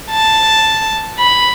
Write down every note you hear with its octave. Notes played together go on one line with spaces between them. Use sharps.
A5
B5